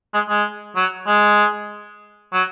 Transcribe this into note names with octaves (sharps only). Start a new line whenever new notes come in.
G#3
G#3
F#3
G#3
F#3